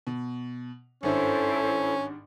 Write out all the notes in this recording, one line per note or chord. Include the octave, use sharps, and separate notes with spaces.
B2
G#1 G2 C#4 E4 A4 C5